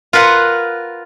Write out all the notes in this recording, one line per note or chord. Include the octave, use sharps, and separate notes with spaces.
F4 A#4 B4 F#5